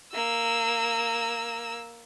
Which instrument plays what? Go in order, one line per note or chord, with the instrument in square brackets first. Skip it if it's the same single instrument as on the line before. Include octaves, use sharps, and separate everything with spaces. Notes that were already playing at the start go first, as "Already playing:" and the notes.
[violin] A#3 E6